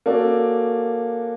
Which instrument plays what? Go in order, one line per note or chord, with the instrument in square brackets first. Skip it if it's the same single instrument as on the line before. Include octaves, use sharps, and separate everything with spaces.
[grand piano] A#3 C#4 F#4 A4 D5